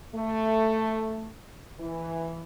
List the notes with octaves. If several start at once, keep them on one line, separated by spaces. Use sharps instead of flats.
A3
E3